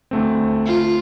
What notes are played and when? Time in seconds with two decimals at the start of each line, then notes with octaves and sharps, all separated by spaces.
0.11 D2 A3 C4
0.66 F4